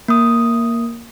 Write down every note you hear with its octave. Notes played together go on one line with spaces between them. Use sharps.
A#3 D#6